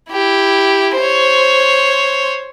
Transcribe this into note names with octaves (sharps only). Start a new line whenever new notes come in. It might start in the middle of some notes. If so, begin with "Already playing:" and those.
E4 G4
C5 C#5